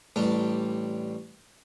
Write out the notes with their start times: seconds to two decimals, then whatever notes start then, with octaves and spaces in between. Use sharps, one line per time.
0.16 A1 G3 D4